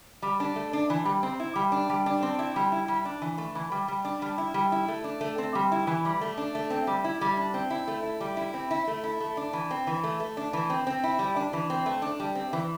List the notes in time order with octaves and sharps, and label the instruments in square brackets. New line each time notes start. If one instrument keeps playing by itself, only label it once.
[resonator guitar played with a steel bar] G3
D4
A3
D4
E3
G3
C4
E4
G3
D4
G3
D4
C4
E4
G3
E4
G3
D4
E3
A3
E3
G3
G3
D4
G3
E4
G3
E4
A3
D4
A3
C4
G3
E4
E3
G3
A3
D4
A3
C4
G3
E4
G3
D4
C4
E4
A3
E4
G3
E4
C4
E4
A3
E4
A3
D4
E3
C4
E3
A3
A3
D4
E3
C4
C4
E4
G3
D4
E3
C4
A3
D4
G3
C4
E3